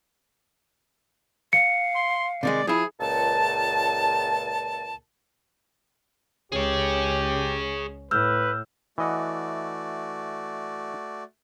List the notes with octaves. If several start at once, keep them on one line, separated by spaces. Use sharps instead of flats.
F5 C#7
C6
C3 D#3 G#3 D5
F3 E4 G#4
C#2 A#2 A5
C#2 C#4 G4 G#4 C#5
A2 B4 E6 F6 G6
E3 A3 F#4 D5 D#5 F#5